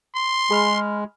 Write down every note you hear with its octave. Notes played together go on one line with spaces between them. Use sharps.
C6
G#3 G#4 B5 F6